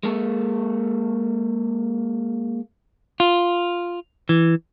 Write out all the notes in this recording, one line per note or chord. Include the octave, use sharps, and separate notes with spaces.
G#3 A#3 A4
F4
E3